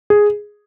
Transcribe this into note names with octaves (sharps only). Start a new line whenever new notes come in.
G#4